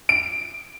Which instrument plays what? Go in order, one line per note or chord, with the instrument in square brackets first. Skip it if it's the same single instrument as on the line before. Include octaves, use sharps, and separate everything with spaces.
[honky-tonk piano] D7